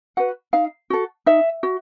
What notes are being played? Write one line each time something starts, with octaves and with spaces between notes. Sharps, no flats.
F#4 B4 F#5
D#4 F5
F#4 A4
D#4 E5
F#4